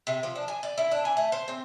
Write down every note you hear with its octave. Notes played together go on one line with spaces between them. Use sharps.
C3
F3
D4
G#5
D5
E4
D4
G#5
A3
C5
C4